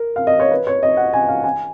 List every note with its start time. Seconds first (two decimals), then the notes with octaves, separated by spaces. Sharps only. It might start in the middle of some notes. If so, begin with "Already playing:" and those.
Already playing: A#4
0.16 F5
0.27 D#5
0.40 C#5
0.51 B4
0.67 C#5
0.83 D#5
0.97 F#5
1.13 G#5
1.29 F5
1.44 G#5